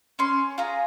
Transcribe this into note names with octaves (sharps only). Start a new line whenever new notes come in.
C#4 C6
F4 G#4 A#5